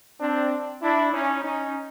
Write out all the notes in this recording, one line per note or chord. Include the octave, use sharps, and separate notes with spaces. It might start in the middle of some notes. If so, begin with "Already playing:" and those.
C4 D4
D4 E4
C#4 D#4
C#4 D#4